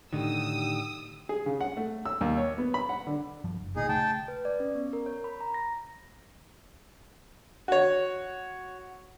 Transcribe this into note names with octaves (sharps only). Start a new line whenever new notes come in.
A2 D3 D#3 D#4 G4 G5 D#6 E6
G#4
C#3
F#5
A3
E6
D#2
C#5
B3
B5
F#5
D3
G2 F3 G3
F#1
D#1 D2 A#2 D#4 G#4
C#3 A3 G5 A5
B4
D5
C#4
B3
A#4
C#5
B5
A#5
A#6
F#4 C#5